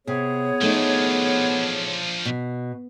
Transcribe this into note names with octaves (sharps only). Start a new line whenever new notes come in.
C3 B3 G#4 C#5
F3 A3 D4 D#4
B2